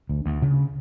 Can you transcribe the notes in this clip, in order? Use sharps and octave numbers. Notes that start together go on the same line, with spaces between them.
D2
D2
C#3